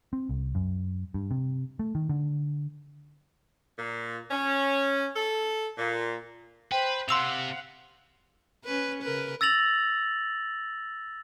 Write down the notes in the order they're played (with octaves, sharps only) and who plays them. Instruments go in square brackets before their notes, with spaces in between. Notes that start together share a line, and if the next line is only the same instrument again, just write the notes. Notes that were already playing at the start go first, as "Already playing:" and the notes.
[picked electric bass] C4
C2
F#2
G2
C3
A3
D#3
D3
[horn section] A#2
C#4
A4
A#2
[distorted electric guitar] B4 [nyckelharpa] C5 [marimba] G5
[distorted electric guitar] C3 [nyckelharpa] F5 F#5 [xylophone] C6 E6 F7
[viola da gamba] C#4 B4
C#3 A#4 B4
[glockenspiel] E6 A6 A#6 F7 F#7